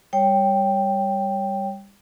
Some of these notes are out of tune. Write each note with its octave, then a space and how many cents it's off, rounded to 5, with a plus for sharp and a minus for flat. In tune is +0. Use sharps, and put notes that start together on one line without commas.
G3 +20 C#5 +0 G5 +0